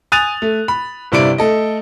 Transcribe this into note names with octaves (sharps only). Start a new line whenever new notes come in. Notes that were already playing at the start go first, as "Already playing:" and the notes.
G#5 D#6 F#6 A6 D#7 F7
A3
B5
G1 C3 E4 D5 D7
A3 A4 D#5